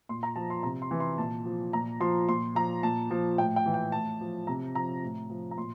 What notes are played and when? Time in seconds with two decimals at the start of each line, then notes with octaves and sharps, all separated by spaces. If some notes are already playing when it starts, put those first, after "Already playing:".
0.09 A#2 C6
0.23 A#5
0.36 F3 A5
0.50 C6
0.63 C3 A#5
0.82 C6
0.91 E3
1.00 C6
1.18 A#2 A5
1.45 F3
1.73 A#2 A#5
2.00 F3 C6
2.28 A#2 C6
2.55 F3 A#5
2.83 A#2 A5
3.11 F3
3.38 A2 G5
3.56 G5
3.66 E3
3.74 G5
3.92 A2 A5
4.21 F3
4.47 C3 A#5
4.75 F3 A#5
5.03 A2
5.30 F3
5.51 A#5
5.57 A#2 C6